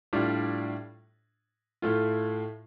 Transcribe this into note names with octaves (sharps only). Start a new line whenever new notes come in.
A2 G3 D4 F4
A2 A3 F4